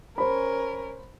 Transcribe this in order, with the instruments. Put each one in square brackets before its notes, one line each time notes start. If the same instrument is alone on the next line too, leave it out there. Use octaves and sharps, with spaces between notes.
[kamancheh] C#4 A#4 [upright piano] C5 B5